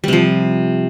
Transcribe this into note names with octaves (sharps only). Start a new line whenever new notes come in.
C3 F3 G3